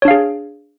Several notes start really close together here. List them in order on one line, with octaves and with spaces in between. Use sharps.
C#5 D4 F5 G#4